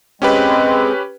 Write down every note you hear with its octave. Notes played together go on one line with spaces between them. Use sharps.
G#3 C4 C#4 G4 B4